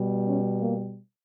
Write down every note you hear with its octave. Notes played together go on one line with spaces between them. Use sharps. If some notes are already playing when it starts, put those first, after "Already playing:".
Already playing: B2 G3
C#4
A#3